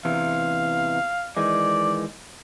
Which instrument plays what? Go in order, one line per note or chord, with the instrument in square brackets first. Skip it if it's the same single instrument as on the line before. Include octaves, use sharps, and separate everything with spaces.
[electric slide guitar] E2 C3 E3 [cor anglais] F5
[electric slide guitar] D#3 E3 G#3 [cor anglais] D5